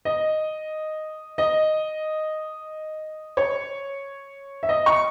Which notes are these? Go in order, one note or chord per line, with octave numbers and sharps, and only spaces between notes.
D#5
D#5
C#5
E5
D#5
C#6